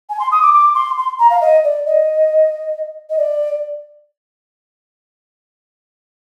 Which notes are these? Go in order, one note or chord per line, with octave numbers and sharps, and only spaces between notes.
G#5
C6
D#6
D6
D6
C6
C6
A#5
F5
D#5
D5
D#5
D#5
D5